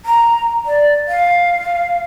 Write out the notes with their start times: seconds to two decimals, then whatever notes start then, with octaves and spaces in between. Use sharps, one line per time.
0.05 A#5
0.65 D5
1.08 F5